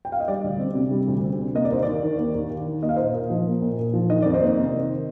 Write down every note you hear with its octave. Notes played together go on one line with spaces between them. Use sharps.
G5
F5
D#5
G3 D5
D2
C4
C3
G3
D2
C4
C3
A#3 D#5
D5
D#2 C5
D#2 D5
D#3
A#3
D#2
D#2
D#3
A#3 D#5
F5
A#2 C5 D#5
A#2
F3
A#3
A#2
A#2
F3
D#3 D#5
F2 D5
C5 D#5
A#3
C3
D#3